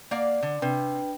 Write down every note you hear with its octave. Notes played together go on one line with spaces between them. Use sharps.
A#3 D5 F5 F#5
D3
C3 D4 B4 G5